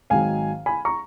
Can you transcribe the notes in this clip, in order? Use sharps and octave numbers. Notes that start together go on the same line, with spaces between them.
G#1 G#2 D#3 F#3 F5 G#5
G#5 B5
A#5 C#6